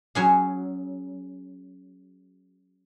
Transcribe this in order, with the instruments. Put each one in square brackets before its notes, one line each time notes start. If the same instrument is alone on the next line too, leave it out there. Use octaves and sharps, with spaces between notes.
[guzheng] F#3 C#4 G#4